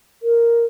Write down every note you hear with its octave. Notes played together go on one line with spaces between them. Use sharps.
A#4